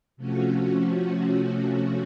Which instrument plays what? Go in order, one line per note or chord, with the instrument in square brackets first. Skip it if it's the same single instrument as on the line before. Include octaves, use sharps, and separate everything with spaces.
[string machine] C3 F3 A3 C#4 F#4